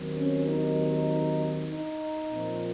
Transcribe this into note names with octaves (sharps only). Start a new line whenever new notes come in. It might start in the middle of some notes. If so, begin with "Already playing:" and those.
Already playing: D#2 D#3 F#3 C4
C#4
D#4
D#4
A#2 F3 C4